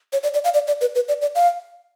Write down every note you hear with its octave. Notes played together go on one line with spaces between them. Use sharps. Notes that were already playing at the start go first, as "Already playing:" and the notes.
C#5
D5
D5
F5
D5
D5
B4
B4
D5
D5
F5